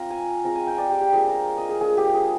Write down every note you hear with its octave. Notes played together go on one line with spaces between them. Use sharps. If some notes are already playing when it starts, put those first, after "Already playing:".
Already playing: C4 F4 A#5
G#5
G#3 C4 F4 A#5
G#5
G5
D5
G4
G4
F3 A#3 D4 G#4
A#4
D#5
G#4
F3 A#3 D4 G#4
G4
G#4